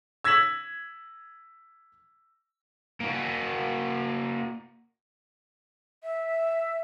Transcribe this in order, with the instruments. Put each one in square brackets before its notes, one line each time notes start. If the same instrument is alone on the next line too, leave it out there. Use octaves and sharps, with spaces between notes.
[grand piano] E6 G#6 A#6 B6 E7 F#7
[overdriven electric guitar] A#3 F#4
[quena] E5